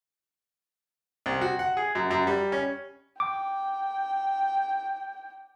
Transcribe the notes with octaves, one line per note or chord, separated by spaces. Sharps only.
C2
F#4
F#5
G#4
F#2
F#2
G3
C#4
G5 D6